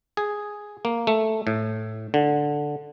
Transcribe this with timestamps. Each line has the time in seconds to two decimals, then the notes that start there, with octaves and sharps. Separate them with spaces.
0.17 G#4
0.85 A#3
1.07 A3
1.47 A2
2.14 D3